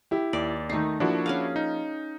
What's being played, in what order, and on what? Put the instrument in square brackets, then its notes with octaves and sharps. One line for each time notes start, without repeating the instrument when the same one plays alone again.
[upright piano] E4 G4
[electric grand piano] D#2 [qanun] D5
[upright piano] D#3 A3 C7 [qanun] D#4 A4
[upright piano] F3 A#3 [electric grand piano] D4 E4 F#4
[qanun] C#4 G#4 F5
[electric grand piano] D#4